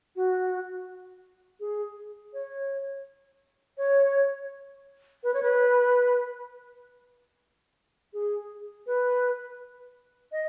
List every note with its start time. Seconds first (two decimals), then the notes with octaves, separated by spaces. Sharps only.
0.16 F#4
1.60 G#4
2.34 C#5
3.78 C#5
5.23 B4
5.34 C#5
5.43 B4
8.13 G#4
8.87 B4
10.32 D#5